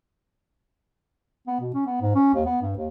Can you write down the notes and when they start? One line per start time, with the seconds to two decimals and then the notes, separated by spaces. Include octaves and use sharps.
1.47 B3
1.60 B2
1.74 C#4
1.86 B3
2.01 G#2
2.15 C#4
2.34 D#2
2.45 B3
2.61 G2
2.76 D#2